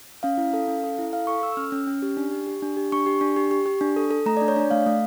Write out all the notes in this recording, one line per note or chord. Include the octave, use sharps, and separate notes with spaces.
C#4 F5
E4
A4
C#4
A4
E4
A4 F5
A4 C#6
A4 E6
E6
C#4 F6
C#4
C#4
G4
D4
G4
G4
D4
G4
D4 C#6
G4
D4
G4
G4
G4
D4
A4
A4
A3 A#5
D4 D5
C#5
D4 D5
A3 F5
A3